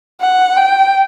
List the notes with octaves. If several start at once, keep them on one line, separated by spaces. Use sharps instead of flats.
F#5
G5